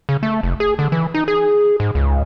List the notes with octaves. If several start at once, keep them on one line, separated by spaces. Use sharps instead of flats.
C#3
A3
F1
G#4
D3
E3
D#4
G#4
G#2
C#2